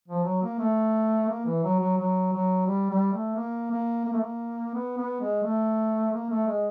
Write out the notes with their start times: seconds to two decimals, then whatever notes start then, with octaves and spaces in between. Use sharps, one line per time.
0.08 F3
0.24 F#3
0.43 A#3
0.59 A3
1.28 A#3
1.45 E3
1.64 F#3
1.80 F#3
1.97 F#3
2.33 F#3
2.67 G3
2.90 G3
3.13 A3
3.36 A#3
3.71 A#3
4.05 A#3
4.13 A3
4.20 A#3
4.74 B3
4.97 B3
5.21 G#3
5.43 A3
6.13 A#3
6.30 A3
6.47 G#3